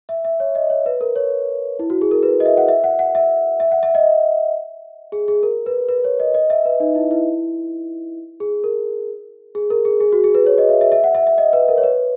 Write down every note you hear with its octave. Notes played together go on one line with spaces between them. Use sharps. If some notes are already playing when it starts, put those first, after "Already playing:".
E5
E5
C#5
D#5
C#5
B4
A#4
C#5
E4
F#4
G#4
A#4
B4
D#5
E5
F#5
E5
F#5
F#5
E5
E5
F#5
E5
D#5
G#4
G#4
A#4
B4
B4
C#5
D#5
D#5
E5
B4
D#4
E4
E4
G#4
A#4
G#4
A#4
G#4
G#4
F#4
G#4
B4
C#5
D#5
E5
E5
E5
F#5
E5
E5
D#5
B4
A#4
C#5
B4